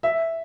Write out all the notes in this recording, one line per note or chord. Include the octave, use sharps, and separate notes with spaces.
E5